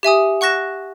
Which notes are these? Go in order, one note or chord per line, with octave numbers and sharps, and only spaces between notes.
G4 E5 G#5 D#6
F#5 C#6 F#6 A#6 E7